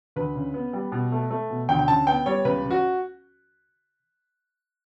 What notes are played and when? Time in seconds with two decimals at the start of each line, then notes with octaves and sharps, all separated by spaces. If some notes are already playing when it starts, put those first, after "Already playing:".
0.16 D2 B4
0.35 C#3
0.54 B3
0.73 G3
0.92 B2
1.12 A3
1.31 A3
1.50 B2
1.69 D2 G5
1.79 G5
1.88 C#3 A5
2.07 B3 G5
2.26 G3 C#5
2.45 C#2 B4
2.64 C#3
2.71 F#4